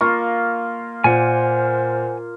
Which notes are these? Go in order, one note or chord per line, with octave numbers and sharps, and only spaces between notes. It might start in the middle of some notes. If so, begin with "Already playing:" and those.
A#3 F4 C#6
A#2 C5 F#5 G#5